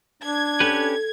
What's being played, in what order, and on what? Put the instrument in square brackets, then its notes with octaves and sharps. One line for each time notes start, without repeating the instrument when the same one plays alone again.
[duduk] D4 [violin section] G#6
[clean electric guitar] C#4 G4 B4 [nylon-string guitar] A4